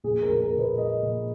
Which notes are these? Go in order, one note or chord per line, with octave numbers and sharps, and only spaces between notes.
A#1 G#4
A#4
A#1
A#4
A#2
B4
G#3 D#5
A#1